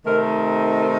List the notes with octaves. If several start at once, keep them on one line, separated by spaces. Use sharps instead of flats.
C3 D#3 A3 C4 D#4 A#4